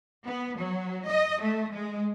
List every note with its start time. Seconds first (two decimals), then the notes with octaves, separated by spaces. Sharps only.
0.25 B3
0.58 F#3
1.05 D#5
1.41 A3
1.72 G#3